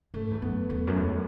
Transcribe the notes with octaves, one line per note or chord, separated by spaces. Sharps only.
G#2 A3
E2 A3
F#2 B3
E2 A3
F#2
E2 G#3